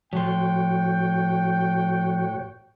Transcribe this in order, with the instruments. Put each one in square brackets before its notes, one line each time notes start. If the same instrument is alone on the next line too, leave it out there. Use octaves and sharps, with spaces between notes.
[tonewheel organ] A2 F#4 C#5 [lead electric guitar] F3 C6 [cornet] G5